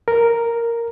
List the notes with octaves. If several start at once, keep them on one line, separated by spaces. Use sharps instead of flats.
A#4